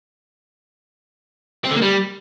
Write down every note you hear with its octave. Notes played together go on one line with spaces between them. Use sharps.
C4
D3
A#3
G3